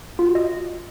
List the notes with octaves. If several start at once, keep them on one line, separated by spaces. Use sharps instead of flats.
F4
F#4
D#5